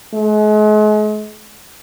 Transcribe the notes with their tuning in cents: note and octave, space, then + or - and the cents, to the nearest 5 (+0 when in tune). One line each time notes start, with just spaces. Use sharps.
G#3 +40